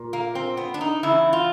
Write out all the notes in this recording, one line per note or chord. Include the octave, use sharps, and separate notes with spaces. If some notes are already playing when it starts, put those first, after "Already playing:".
Already playing: A#2
A#3
C4
B3
D4
D#4
E2 C#3 E4
F4